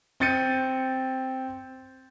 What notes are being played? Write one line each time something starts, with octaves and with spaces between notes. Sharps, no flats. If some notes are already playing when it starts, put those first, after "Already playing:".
C4 G6 A6 C#7 D#7